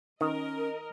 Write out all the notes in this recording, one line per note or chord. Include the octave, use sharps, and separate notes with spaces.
D#3 C#4 A#4 D#5